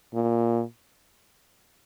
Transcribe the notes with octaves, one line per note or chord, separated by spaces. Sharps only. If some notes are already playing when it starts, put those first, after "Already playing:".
A#2